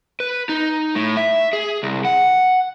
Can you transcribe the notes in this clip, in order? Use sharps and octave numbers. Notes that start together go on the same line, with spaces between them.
B4
D#4
A2
E5
G#4
C2
F#5